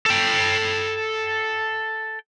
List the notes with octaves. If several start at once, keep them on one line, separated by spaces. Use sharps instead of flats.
A4 G5